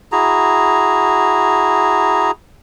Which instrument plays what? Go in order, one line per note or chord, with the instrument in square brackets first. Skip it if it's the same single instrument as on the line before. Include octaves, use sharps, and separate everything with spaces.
[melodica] E4 F#4 G#4 A#5